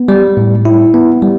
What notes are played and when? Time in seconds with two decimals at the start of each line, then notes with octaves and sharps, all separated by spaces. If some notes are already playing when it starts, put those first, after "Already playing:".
Already playing: B3
0.08 G3
0.37 A2
0.65 E4
0.94 B3
1.22 G3